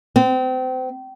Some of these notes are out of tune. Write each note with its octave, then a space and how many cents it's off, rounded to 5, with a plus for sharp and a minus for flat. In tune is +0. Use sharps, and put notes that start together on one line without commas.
C4 -30